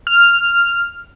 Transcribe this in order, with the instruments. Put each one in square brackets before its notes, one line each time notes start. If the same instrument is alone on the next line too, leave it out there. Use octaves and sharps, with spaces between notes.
[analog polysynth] F6